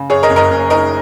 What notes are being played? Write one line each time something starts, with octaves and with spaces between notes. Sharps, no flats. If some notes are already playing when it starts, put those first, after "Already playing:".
Already playing: C#3
F#2 G#4 C#5
A#4 D#5
F#1
A#4 D#5
F#1
D#3 A#4 D#5